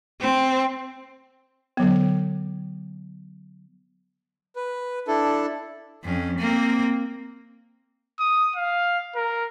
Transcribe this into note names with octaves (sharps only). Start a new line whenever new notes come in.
C4
D3 F#3 B3
B4
D4 E4 A4
F2 C#4
A#3 C4
D#6
F5
A#4